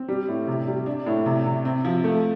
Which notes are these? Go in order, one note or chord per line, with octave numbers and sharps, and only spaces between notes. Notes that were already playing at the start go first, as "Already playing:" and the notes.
Already playing: C4
G3
A2
C3
G3
D4
A2
C3
C3
C4
F3
A3